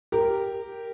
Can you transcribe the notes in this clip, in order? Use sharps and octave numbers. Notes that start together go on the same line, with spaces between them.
G4 A#4